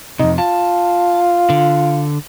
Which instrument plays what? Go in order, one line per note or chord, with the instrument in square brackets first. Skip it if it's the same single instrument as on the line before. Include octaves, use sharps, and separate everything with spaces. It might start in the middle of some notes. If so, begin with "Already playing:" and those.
[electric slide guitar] F2 C3 [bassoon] D#4
[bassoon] F4 [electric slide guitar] A5
[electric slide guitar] D3